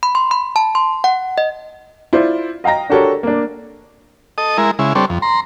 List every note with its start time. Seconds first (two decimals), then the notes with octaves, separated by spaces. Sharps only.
0.03 B5
0.15 C6
0.31 B5
0.56 A5
0.75 C6
1.04 F#5
1.38 D#5
2.13 E4 F4 C5 D5
2.64 D#5 F5 G5 A#5 A#6
2.90 D4 F#4 G4 A4 A#4 C#5
3.23 A#3 D4
4.38 A4 D#5 D#6
4.58 G#3 E4 A#4
4.79 C#3 G#3 E4
4.95 G3 C4 D4 A4 C#5
5.10 F2
5.22 A#5 C6